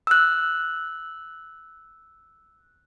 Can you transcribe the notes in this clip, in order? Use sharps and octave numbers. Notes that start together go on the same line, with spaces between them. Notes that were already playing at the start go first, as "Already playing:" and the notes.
E6 F#6